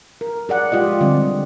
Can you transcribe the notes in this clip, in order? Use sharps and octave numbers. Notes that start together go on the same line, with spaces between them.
A#4
G#4 D5 F#5
G#3 F4 G4 D#5
D3 G3 C4 D5